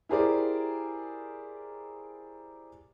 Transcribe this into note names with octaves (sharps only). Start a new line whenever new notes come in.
E4 G4 G#4 A#4 C5 D5